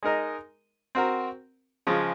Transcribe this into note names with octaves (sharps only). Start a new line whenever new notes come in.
G#3 D#4 A#4 D#5
C4 F#4 A#4
C#3 F3 G#3